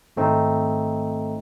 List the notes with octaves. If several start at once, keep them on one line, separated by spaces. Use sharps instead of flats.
G#1 A3 C4 D#4